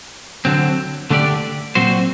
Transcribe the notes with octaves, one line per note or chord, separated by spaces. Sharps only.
D3 F#3 C4
D3 A3 D4 G4 D5
A#2 F#3 C4 F#4 C5